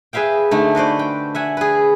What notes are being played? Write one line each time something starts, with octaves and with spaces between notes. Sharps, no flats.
G#4 B4 E5 F5 G5
D3 A3 D4 D#4
F#4 B4 C5 D5
G5
E5 F#5 G#5
G#4 B4